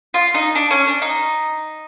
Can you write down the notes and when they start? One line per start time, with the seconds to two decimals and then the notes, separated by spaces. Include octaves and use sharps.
0.14 F4
0.34 D#4
0.55 D4
0.70 C#4
0.87 D4
1.02 D#4